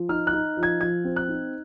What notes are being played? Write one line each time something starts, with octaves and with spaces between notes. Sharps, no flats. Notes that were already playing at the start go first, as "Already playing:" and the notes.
Already playing: F3
D#4 F6
F#6
D#4
F3
G#6
F3 G#6
C4
F#6
D#4